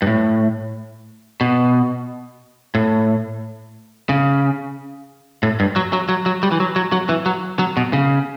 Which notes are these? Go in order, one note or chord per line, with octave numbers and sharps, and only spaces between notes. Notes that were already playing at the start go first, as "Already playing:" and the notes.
G2
A2
B2
A2
C#3
A2
G2
F#3
F#3
F#3
F#3
G3
E3
F#3
F#3
F#3
E3
F#3
F#3
B2
C#3